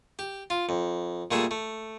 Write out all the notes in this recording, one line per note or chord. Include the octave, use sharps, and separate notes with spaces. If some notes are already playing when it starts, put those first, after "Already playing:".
G4
F4
F2
A#2 G3 A3 G#4 E5
A3